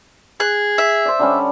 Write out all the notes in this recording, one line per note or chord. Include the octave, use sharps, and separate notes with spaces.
G#4 F#6
E5
C5 D5
D3 G3 C#4